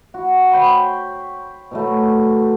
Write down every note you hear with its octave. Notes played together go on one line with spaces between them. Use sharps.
F#4
C#5 G5 B5 C6
B2 F#3 A3